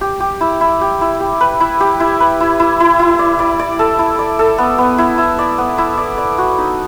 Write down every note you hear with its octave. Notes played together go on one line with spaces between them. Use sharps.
G4
G4
E4
E4
G4
E4
G4
B4
E4
G4
E4
B4
E4
E4
E4
E4
D5
D5
D5
A4
E4
D5
A4
B3
B3
E4
E4
D5
B3
E4
D5
D5
F#4
D#4